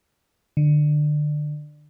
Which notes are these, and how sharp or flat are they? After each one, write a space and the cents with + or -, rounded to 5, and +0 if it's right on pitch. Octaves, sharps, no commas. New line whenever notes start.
D3 +25